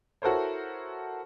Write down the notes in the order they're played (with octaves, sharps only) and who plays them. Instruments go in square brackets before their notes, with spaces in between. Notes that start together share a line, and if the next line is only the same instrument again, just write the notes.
[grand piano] E4 F#4 A4 A#4 C5 C#5